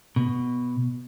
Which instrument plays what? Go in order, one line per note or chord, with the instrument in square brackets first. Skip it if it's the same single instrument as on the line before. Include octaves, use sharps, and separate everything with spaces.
[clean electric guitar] B2